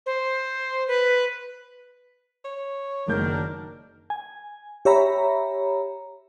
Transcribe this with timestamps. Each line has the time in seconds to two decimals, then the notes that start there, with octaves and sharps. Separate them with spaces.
0.06 C5
0.88 B4
2.45 C#5
3.08 F#1 D#3 F#3 D4 A#4 G6
4.10 G#5
4.85 G4 C#5 E5 A#5 B5